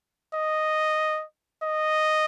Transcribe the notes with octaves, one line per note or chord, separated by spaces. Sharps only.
D#5
D#5